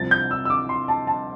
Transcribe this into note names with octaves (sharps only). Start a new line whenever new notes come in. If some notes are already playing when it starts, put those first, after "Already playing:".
Already playing: C2 C3 F3 A6
G6
E6
E6
D6
C6
A5
A5